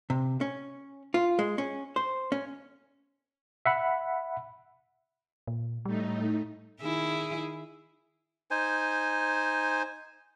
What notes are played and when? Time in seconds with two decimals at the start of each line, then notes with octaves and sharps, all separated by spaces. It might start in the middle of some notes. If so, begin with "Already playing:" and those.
0.10 C3
0.41 C#4
1.14 F4
1.39 G#3
1.58 C#4
1.96 C5
2.32 C#4
3.66 E5 F#5 B5
5.47 A#2
5.85 A2 G3 A3 D#4
6.81 D#3 E4 G#4
8.51 D#4 C5 G#5